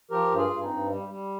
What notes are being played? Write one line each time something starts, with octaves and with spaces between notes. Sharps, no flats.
F3 G4 A#4
G2
F4 G#4
G2
C4 D#4
G2
G3
G3